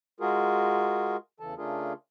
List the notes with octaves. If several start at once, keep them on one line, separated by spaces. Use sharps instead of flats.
G#3 F4 F#4 G#4 A#4
E2 C#3 E3 A4 A5
C#3 A3 D4 F4 G#4 A#4